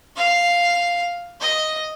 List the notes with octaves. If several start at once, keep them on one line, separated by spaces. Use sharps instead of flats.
F5
D#5